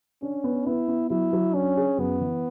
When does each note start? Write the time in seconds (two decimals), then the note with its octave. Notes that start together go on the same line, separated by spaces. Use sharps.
0.22 C#4 D4
0.44 B3
0.66 B3 E4
0.88 B3
1.10 F#3 E4
1.33 F#3
1.54 C#4 D4
1.77 G#4
1.98 F#2 B3
2.21 E3